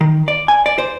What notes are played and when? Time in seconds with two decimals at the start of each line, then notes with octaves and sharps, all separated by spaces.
0.01 D#3
0.28 D5
0.48 G#5
0.66 D5
0.78 C5